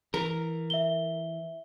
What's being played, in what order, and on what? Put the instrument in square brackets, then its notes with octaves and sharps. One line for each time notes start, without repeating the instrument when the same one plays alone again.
[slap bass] E3 [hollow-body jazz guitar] A#4
[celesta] E5 G7